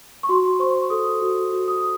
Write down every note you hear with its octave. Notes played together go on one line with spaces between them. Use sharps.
C#6
F#4 C6
C5 C#6
C#6
A4 D#6
F#4
F#4
D#6